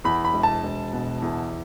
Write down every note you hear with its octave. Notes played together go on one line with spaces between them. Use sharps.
E2 B5
B5
E1
A5
E1
B2
E2